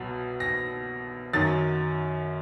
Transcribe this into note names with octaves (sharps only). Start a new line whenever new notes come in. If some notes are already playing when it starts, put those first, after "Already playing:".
Already playing: C2 B2 F#3
A#6
F#2 D#3 F#3 A6